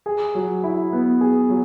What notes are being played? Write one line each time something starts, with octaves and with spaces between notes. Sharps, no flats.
G#4
F#3
E4
B3
G#4
F#3